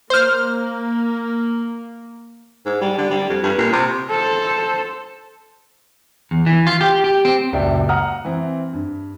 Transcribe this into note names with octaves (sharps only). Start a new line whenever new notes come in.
A#3 C5 F6
G#2
G3
D3
G3
F2
G2
A#2
C3
A4 C5
E2
E3
F4
G4
G4
C4
D#1 C#2 F#2 D5 E5 G5
F#5 A#5 D#6 F6
E3 C4
G2